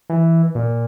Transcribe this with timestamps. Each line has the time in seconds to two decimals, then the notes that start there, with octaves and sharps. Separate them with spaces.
0.10 E3
0.55 A#2